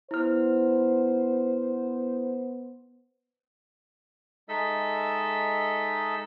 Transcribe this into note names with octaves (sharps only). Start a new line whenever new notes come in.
B3 E4 C5 F6
G#3 D#4 A4 D#5 E5 E6